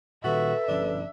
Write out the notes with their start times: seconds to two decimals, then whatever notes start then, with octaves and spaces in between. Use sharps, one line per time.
0.24 A#2 D#3 F#4 A4 B4 E5
0.68 G1 F3 C#4 D4